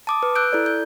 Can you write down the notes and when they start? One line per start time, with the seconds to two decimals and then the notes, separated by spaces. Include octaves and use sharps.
0.07 A5 D6 D#6
0.23 B4
0.35 E6 F#6 G6 D7
0.53 E4 A4 D5
0.66 G6